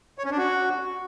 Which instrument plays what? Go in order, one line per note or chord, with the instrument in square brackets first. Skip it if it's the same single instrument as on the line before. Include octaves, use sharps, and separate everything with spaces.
[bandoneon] C#5
C#4
D4
F#4